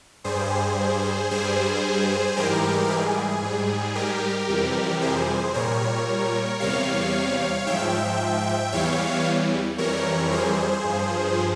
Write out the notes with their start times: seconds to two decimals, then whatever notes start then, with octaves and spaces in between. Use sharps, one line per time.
0.24 G2 G3 G#4 C5
1.31 G2 G3 G#4 C5
2.36 G#2 E3 G3 G4 A#4
2.90 G#4
3.42 G#2 G3
3.95 G4 A#4
4.48 F2 C3 E3 G3
5.01 G#4 C5
5.54 A#2 G3 A#4 C#5
6.60 E2 C3 G3 C#5 F5
7.67 G#2 F3 E5 G5
8.72 E2 E3 G3 C#5 F5
9.78 F2 E3 G3 A#4 C#5
10.32 G#4 C5
10.84 G2 F3